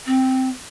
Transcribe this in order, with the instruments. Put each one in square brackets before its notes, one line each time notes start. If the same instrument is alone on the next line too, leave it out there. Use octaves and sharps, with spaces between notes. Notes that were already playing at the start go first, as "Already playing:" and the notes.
[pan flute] C4